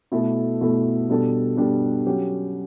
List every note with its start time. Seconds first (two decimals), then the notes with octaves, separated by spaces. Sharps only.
0.12 B2 A3 E4 A4
0.61 B2 A3 E4 A4
1.10 B2 G3 D4 A4
1.57 B2 G3 D4 A4
2.06 F#3 C#4 G4